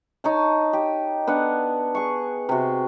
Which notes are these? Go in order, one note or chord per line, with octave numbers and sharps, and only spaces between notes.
D#4 C#5 A5
G4
B3 D4 F#5
G#4 C#6
C3 F#4